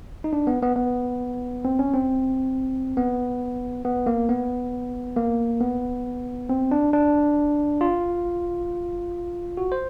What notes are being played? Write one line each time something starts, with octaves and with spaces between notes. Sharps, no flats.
D#4
D4
B3
B3
B3
C4
C#4
C4
B3
B3
A#3
B3
A#3
B3
C4
D4
D4
F4
F#4
C5